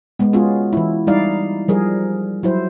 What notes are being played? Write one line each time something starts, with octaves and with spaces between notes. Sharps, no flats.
G#3 B3
G#3 B3 C#4 F4 F#4 G#4
E3 E4
G3 D#4 E4 D5 F5
F3 G3 G#4 A#4
F#3 E4 C5